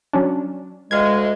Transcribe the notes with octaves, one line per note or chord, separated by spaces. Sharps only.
F#3 C#4 D4
D2 G#3 F5 G#6